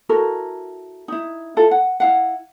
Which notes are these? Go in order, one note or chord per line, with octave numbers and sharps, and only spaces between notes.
E4 F#4 A4 A#4
D#4 E4
E4 F4 A4
F#5
E4 F5 F#5